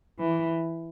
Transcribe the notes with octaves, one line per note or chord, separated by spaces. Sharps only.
E3